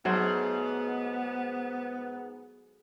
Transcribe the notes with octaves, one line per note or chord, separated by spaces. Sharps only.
G#2 F#3 A3 B3 C5